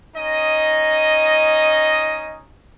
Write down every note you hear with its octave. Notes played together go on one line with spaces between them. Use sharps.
C#4 D#4 D#5